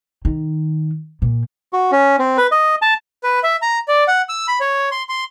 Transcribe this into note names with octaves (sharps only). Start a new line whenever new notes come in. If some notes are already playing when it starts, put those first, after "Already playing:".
D#3
A#2
F#4
C#4
C4
B4
D#5
A5
B4
E5
A#5
D5
F#5
E6
B5
C#5
C6
C6